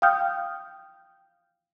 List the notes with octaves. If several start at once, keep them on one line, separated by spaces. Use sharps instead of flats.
F5 G5 D#6 F6 G6